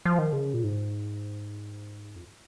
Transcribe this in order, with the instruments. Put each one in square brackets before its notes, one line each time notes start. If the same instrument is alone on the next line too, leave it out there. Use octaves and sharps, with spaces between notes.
[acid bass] F3
D#3
C#3
A#2
G#2
F2